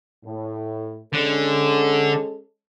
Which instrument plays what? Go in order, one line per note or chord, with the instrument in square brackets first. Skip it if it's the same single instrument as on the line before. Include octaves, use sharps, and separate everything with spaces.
[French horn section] A2
[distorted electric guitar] D3 [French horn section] G#3 C#4 A4